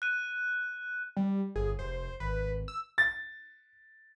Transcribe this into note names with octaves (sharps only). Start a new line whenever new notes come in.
F#6 D#7
G3
G1 G#4
F1 C5
G#1 B4
E6
A6